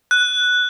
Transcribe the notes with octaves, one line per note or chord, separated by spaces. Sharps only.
F#6